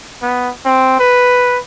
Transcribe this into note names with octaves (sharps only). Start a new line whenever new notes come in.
B3
C4
B4